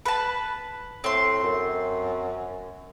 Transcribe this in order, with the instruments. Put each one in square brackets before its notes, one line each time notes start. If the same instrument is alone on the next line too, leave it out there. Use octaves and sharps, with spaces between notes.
[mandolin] B4 A5
[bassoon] A2 [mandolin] C4 C6
[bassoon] F#2